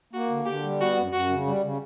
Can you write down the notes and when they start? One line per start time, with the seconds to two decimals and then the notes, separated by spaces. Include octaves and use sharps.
0.13 A#3 F#4
0.30 D3
0.46 D3 G4
0.63 G3
0.80 B3 F#4
0.97 F#2
1.12 F#2 F#4
1.30 C#3
1.46 G3
1.62 C#3